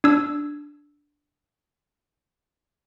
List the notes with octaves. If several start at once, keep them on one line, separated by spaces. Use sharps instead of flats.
D4 E6